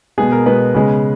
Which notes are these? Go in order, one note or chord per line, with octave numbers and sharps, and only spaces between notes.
B2 G#3 B3 G#4
A#4
B2 G#3 B3 B4
C#3 G#3 B3